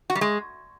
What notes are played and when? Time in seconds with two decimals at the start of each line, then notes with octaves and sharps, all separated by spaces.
0.10 F#4
0.15 G3
0.21 G#3